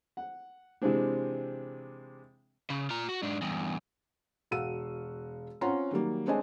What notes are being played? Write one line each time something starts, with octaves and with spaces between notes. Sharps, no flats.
F#5
C3 E3 G#3 C4 D4
C#3
F4 A#5
F#4
G#2 D4
E2 G2
E1 F#4 F5 E6 D#7
C4 C#4 F4 F#5 A#5 C6
D#3 F#3 G3 A#3
G#3 C4 D4 C#5 D#5 G#5